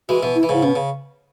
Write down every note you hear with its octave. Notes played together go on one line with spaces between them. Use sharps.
E3 G#3 F#4
B2 E3
E4
E3
G#2 C#3 E4
B2 C#4
C#3